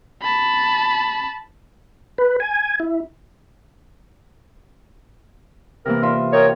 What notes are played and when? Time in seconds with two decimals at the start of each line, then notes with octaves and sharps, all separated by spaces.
0.22 A5 B5
2.18 B4
2.40 G#5
2.80 E4
5.86 C3 E3 A#3 A#4
6.03 F4 E5
6.33 A#4 C#5 D#5 G5